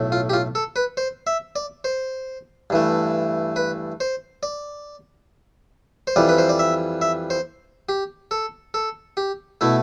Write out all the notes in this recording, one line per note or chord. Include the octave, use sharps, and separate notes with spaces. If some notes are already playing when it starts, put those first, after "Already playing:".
Already playing: B1 A2 A3
F4
G4
F4
A4
B4
C5
E5
D5
C5
G2 E3 A3
B4
C5
D5
C5
F2 E3 G3 D5
B4
C5
D5
E5
E5
C5
G4
A4
A4
G4
B2 A3 E4